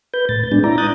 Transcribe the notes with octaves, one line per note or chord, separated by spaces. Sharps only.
B4 G6
A2 A6
G#3 B3 D4
E4 D5 A#5
A#5 D#6 F#6 G6 A6